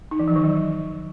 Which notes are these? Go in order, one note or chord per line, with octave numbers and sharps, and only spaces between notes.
D#4
E3
F3
D#3
F#3